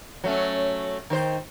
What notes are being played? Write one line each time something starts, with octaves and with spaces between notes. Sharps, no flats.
F#3 A3 C#4
D#3 D#4 C5